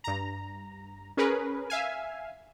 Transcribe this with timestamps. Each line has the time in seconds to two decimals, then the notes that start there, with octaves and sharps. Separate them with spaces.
0.04 G2 A#5
1.17 C#4 G#4 A#4 B4
1.70 E5 F5 G#5